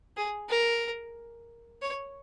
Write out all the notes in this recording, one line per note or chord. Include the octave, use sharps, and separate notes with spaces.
G#4
A#4
C#5